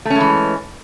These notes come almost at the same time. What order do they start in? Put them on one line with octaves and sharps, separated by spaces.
A3 C#4 G#3 E3